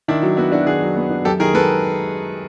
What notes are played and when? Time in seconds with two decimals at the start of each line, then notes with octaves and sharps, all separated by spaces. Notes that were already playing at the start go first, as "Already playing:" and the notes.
0.08 D#3 D4 E4
0.22 F#3
0.37 B3 E4 F#4
0.52 D4 E4 F#4
0.66 D#3 F#4 G#4
0.82 F#3
0.96 B3
1.10 D4
1.25 F#2 G4 A4
1.40 D#3 G#4 A#4
1.54 G#3 A4 B4